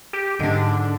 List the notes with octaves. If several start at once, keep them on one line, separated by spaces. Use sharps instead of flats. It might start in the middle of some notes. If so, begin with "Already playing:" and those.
G4
G#2 D3 D4